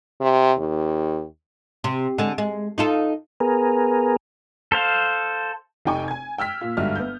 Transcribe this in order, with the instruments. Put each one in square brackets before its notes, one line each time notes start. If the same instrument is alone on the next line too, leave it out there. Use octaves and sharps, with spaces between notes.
[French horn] C3
D#2
[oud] C3
D3 G#3
G#3
D#4 F4 A4
[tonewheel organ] B3 G#4 A#4
[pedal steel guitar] A4 C5 F5
[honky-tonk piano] F1 C3 D#4 G5 G#5 C#6
G#5 G#6
G5 E6 F6 B6
A#2 F4
G1 G#2 G3 F#4 E5 F6
B3 G6